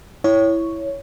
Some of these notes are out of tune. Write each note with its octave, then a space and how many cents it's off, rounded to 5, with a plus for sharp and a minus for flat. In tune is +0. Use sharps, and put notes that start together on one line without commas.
E4 +0 C#5 +5